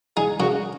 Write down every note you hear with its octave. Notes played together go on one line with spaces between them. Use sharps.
D#4 G#4
C#3 F#4